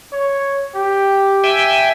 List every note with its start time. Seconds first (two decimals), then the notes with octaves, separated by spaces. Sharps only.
0.13 C#5
0.75 G4
1.44 E5 G5 G#5